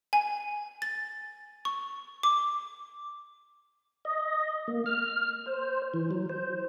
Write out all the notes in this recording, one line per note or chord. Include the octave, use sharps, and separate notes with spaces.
G#5
A6
C#6
D6
D#5
A#3
F6
C5
E3
F#3
C5